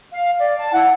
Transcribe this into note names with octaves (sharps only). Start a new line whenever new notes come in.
F5
D5
A5
E4 F#5